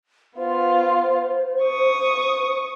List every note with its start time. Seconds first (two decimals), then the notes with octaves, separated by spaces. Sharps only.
0.37 B3 F4 C5
1.62 C#6 D#6